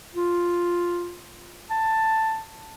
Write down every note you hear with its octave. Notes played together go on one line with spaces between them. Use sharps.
F4
A5